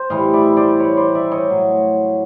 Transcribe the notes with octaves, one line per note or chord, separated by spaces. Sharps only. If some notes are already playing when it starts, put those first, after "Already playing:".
Already playing: G4 C5
A2 E3 G3 D#5 F5
D5 E5
C5 D5
B4 C#5
C5 D5
D5 E5
C#5 D#5
A2 F#3